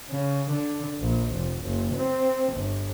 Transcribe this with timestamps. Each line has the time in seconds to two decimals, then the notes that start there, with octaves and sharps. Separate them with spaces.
0.10 C#3
0.51 D3
1.00 A#1
1.33 F1
1.64 F#1
1.95 C4
2.54 G1